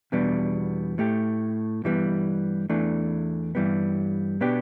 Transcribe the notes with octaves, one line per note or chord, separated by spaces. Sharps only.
E2 B2 G3 B3 D4
A2 A3 G4
G2 E3 G3 B3
E2 E3 A3 D4
G2 E3 G3 B3
B2 B3 D4 G4